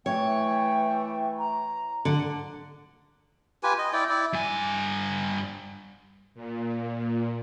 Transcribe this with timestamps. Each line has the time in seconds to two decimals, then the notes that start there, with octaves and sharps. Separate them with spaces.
0.06 E3 A3 C#5 G5
1.39 A#5
2.05 D3
3.63 F4 G4 B4 G#5
3.78 D#5
3.93 E4 D5 G5
4.09 E4 D5
4.33 G2 G#5
6.34 A#2